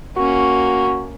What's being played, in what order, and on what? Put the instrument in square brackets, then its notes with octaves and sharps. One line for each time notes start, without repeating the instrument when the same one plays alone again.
[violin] A#3 C#4 [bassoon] F#4